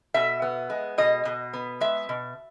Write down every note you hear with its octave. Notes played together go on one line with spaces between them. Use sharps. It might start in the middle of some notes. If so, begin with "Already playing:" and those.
B2 E5
B3
G#3
B2 D#5
B2
B3
G#3 E5
B2